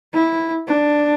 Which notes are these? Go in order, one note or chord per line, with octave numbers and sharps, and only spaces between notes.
E4
D4